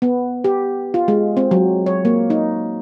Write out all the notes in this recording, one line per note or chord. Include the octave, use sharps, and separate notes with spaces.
B3
G4
F4
G#3
C4
F#3
C#5
A#3
D#4